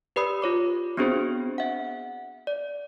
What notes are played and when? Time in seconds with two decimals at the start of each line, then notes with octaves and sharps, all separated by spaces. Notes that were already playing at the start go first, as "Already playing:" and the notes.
0.16 G4 B4 D5 B5 D#6 E6
0.42 F4 C#5 D6
0.97 B3 C4 D4 F#4 G#4 C5
1.58 E5 F#5
2.47 D5